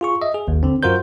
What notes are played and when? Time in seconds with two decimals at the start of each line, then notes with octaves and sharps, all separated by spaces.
0.01 F4 G#4 C#6
0.22 D#5 E5
0.34 G#4
0.47 G#1 D#2
0.63 D3 C4
0.83 F#2 F4 F#4 A#4 C5 G6